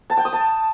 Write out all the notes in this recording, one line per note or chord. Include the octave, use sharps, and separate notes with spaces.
A5
G5
D#6
A5